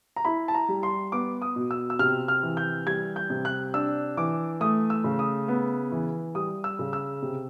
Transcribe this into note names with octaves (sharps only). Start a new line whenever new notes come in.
A#5
E4 B5
A5
A#5
G3
C6
B3 D6
D#6
B2
E6
E6
C3 F6
F6
E3
G6
G3 G#6
G6
C3
F#6
D4 E6
E3 D6
A3 D#6
E6
C#3
D#6
B3
E3
G3 D#6
E6
C#3
E6
C3